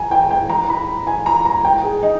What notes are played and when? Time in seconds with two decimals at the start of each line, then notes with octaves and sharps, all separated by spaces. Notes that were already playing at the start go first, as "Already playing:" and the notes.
Already playing: G#5 A#5
0.11 G5
0.31 G5
0.50 A#5
0.69 B5
1.07 G#5
1.26 A#5
1.45 A#5
1.65 G5
1.84 G#4
2.03 D#4